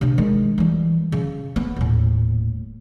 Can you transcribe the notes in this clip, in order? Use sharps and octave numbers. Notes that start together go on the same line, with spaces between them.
C3 D4
D#3 G#3
E3 G3
C#3
B3
D#1 A2